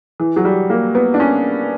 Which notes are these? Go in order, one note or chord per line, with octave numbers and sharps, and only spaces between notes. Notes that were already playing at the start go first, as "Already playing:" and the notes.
E3
F#3
G3
A#3
B3
D4
C#4